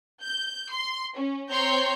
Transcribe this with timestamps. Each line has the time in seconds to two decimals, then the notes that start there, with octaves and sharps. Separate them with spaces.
0.22 G6
0.71 C6
1.16 C#4
1.50 C4 C#5 A#5 C6 G6